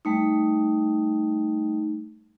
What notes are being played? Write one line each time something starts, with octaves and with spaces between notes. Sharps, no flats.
G3 A3 D#4